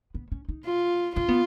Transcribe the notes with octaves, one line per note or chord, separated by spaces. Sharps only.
B3
C#4
D#4
F4
C#4 F4
B3